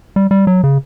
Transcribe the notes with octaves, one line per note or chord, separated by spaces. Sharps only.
G3
G3
F#3
C#3